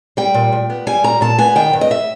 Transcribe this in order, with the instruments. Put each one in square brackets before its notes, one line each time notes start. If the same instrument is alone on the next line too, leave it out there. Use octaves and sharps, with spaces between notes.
[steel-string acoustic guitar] G3 G5
A#2
A#2
B3
G3 G#5
A#2 A#5
A#2 A5
B3 G#5
D#3 G5
G2
D#5
E5